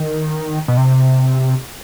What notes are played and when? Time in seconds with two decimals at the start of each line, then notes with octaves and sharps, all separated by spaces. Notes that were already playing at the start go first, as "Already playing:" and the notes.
Already playing: D#3
0.68 B2
0.77 C3